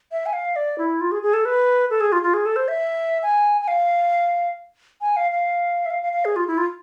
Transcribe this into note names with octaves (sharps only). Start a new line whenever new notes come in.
E5
G#5
F5
D5
E4
F4
G#4
G#4
A4
B4
A4
G#4
F4
F4
G#4
A4
C5
E5
G#5
G#5
F5
G#5
F5
F5
E5
F5
F5
F5
G#4
F4
E4
F4